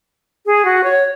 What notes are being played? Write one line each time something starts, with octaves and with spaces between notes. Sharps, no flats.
G#4
F#4
C#5